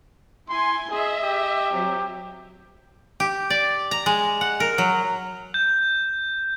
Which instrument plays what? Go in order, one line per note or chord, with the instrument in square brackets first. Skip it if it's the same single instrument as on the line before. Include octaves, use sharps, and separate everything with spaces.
[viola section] E4 G#5 [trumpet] C6
[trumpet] G#4 [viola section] D#5 E5
[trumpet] G4
[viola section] F#3 C4
[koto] G4
D5
A#5
G#3
F#5
A#4
F#3
[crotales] G6